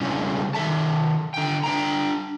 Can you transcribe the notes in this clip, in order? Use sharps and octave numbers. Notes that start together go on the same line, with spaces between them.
C#3 G3 G#3 C#4 D4 E4
D#3 C4 A4 E5 A5
D3 G5
D4 G5 A#5